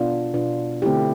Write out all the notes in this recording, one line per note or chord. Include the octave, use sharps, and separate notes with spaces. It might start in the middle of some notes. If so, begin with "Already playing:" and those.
Already playing: B2 B3 D4 F4
B2 B3 D4 F4
D3 A3 C4 E4 G4